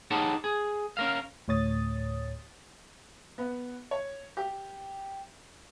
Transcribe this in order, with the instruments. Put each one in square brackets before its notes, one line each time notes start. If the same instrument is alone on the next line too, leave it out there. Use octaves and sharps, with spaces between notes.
[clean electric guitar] D#4 G4 G#4 C#5 F#5 A5
G#4
C#4 A#4 F5
[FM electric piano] D2 A2 C#5 D#6 A6
[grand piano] B3
C#5
G4